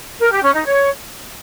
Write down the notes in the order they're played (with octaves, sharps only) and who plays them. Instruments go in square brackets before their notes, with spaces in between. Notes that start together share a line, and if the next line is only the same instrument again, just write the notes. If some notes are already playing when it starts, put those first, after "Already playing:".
[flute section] A#4
G4
C#4
D#4
C#5